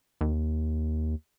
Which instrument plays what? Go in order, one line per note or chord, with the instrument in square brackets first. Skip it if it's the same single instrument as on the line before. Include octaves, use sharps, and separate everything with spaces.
[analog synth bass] D#2